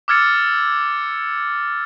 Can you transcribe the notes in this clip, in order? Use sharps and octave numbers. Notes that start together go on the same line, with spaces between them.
D6 E6 F6 G#6 A6 C#7